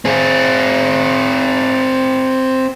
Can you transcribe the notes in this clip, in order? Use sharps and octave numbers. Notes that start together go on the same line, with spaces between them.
C4 G#4